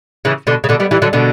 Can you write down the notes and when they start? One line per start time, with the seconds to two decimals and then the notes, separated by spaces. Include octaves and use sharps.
0.25 C#3 E3
0.47 B2 D3
0.64 C#3
0.69 B2 D3
0.80 G3 B3
0.91 E3 G3
1.02 D3 F#3
1.13 B2 D3